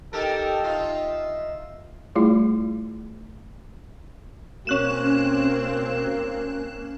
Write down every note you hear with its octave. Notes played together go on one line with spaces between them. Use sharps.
D#4 G4 A4 A#4
D#4 F4 E5
G3 A3 E4 F4 G#4
B2 A#3 C4 C#4 F#6 E7